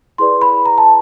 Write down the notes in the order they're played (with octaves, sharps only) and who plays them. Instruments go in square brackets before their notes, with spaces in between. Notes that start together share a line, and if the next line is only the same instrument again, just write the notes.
[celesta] E4 G#4 B4 D5 C6
B5
A#5
A5